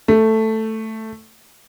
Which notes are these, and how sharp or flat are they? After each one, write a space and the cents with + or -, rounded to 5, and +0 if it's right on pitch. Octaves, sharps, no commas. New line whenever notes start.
A3 +5